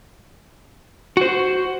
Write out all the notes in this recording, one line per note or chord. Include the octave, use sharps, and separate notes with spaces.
F#4 C5